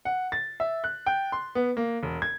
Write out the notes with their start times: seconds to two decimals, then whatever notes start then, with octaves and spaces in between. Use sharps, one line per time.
0.05 F#5
0.32 A6
0.60 E5
0.84 F#6
1.06 G5
1.32 C6
1.55 B3
1.77 A#3
2.03 E1
2.22 G#6